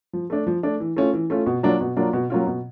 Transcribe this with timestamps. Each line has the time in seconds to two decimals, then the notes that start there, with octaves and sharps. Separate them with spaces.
0.13 F3
0.30 A3 D4
0.47 F3
0.63 A3 D4
0.80 E3
0.96 A3 C#4 F4
1.13 E3
1.30 A3 C#4 F4
1.46 B2
1.63 F#3 A#3 D4 F4
1.81 B2
1.97 F#3 A#3 D4 F4
2.13 B2
2.30 F#3 A#3 C#4 F4
2.47 B2